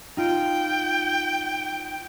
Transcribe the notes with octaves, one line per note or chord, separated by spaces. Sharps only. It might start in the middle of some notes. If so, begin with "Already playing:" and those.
D#4 F4 G5